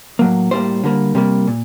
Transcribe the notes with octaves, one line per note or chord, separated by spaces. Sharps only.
A2 F#3 A#3
A2 G3 A#3 C5
D3 G3 A#3
C3 G3 A#3
A#2